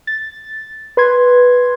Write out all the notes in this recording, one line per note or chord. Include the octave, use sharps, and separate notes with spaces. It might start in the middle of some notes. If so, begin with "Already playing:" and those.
A6
B4 C6 G#6